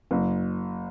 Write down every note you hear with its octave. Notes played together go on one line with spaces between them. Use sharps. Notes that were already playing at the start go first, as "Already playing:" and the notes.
F#1